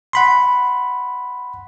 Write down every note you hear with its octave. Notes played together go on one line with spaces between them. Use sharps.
F#5 B5 C6